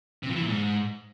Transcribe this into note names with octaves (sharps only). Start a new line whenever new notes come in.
C3
F3
E3
A#2
G#2